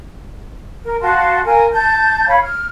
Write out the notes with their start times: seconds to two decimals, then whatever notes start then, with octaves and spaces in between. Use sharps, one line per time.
0.83 A#4
1.00 F#4 F5 A5 C6
1.44 F4 A#4 G#5
1.72 A5 G6
2.27 C#5 F5 B5
2.42 F6